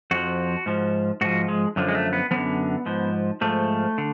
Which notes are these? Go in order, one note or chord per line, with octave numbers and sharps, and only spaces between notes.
F2 F3 F#4
G#2 F3
G#2 F3 F#4
G#3
F#2 D3 F3
G#3
A3
B3
F#2 D3 F3 B3
G#2 F3
G#2 F3 A3
D3